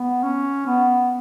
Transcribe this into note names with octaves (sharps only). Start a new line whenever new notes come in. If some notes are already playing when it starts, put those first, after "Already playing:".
Already playing: B3
C#4
B3